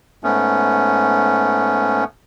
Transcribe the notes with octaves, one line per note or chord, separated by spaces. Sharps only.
G#2 A3 B3 C#4